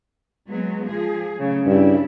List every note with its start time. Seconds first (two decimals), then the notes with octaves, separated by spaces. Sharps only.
0.49 F#3 G#3 B3
0.86 F3 G#4
1.36 C#3 F#3 A3
1.66 G2 C#3 D4 E4